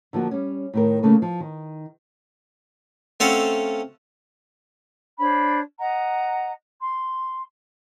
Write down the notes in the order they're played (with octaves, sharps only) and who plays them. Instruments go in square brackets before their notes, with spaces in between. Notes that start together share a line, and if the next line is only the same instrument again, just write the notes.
[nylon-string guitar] D3 F3 A#3 F#4
G3 C#4
A2 D#3 A#4
C#3 A3 A#3 B4
F3
D#3
[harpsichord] A3 C4 C#4 A4 F5 F#5
[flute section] D4 C5 C#5 B5
D#5 F#5 A#5
C6